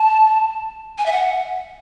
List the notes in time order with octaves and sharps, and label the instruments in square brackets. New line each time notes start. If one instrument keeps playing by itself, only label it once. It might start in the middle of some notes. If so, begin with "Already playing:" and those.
Already playing: [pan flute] A5
G#5
E5
F#5